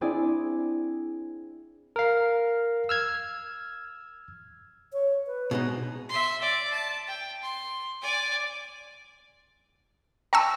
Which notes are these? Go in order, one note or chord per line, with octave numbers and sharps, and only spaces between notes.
C4 D4 E4 G#4 D5
A#4 F5
E6 F6 G#6
C#5
B4
B2 G#3 D#4
E5 C6
D5
A5
G5
C6
D5 G#5
G5 A5 A#5 C#6 E6